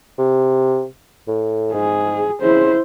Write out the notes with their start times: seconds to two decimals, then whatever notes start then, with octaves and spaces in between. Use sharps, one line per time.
0.18 C3
1.28 A2
1.74 G#2 G#4
2.42 C#3 E4 C5